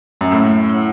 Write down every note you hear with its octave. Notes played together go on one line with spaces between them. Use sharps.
F#2
A2 C#4
E4 C#5 F#5